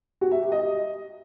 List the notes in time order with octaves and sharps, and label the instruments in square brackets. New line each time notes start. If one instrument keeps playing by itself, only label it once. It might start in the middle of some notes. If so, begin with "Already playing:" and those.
[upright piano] F#4
E5
G4
D#5